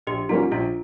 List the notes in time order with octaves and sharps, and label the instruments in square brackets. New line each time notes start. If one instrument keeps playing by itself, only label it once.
[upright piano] A#1 [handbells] G4
[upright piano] G#2 G3 A#3 C#4 [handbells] F4
[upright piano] A#1 [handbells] F4